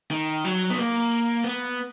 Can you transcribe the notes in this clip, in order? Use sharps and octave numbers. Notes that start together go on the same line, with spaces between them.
D#3
F#3
B3
A#3
B3